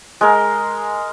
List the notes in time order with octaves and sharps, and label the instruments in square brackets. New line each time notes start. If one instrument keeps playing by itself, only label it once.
[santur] G#3 A#4